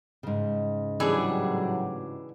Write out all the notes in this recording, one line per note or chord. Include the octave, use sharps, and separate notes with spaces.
G#2 C#3
A2 E3 F#3 G3 D4 G#4